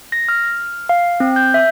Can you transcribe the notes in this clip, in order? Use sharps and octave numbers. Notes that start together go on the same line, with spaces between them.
A#6
F6
F5
C4
G6
E5